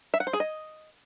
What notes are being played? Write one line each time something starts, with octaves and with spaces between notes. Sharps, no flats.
E5
F#5
C5
G#4
D#5